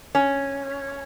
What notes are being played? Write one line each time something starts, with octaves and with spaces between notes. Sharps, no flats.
C#4